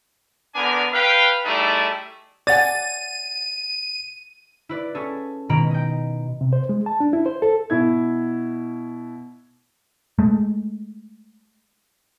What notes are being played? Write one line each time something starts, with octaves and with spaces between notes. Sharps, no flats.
D3 B3 D4 A#4 G#5
B4 F5 G5
G3 A3 D#4 E4 G#4 A4
C#5 D5 F#5 G#5 A6 D#7
E4 B4 D5
C#4 E4 G#4 A4
B2 D#3 G#3 A#5 B5 D7
D#5 G5
C3
C5
G#3
A5
D4
E4
C5
A4
B2 E4 G#6
G#3 A3